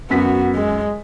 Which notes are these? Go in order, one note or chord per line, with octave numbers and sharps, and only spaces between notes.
F#2 B3 F#4 B6
G#3